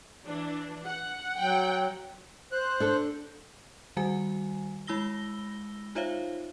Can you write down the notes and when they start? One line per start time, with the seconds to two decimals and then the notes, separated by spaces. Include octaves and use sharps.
0.24 E3 D4
0.85 F#5
1.37 F#3 G5
2.52 C5 F#6
2.80 D4 A4
3.97 D#3 G3 F#4 G#5
4.87 G#3 E4 B5 E6 A#6 G7
5.95 D#4 F4 C5 C#5 E5 F5